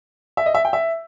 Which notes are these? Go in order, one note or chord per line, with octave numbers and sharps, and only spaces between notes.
E5
D#5
E5
G5
E5